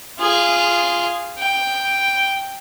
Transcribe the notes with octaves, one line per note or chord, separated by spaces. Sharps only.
F4 G#4
G5